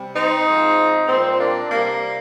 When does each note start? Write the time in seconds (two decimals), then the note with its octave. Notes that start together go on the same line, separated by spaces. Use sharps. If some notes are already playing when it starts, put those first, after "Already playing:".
Already playing: C3 G3
0.15 C4 D#4
0.46 G#2 F3 G#3
1.08 A#2 G3 C4
1.39 A#3 D4
1.70 C3 G3 A#3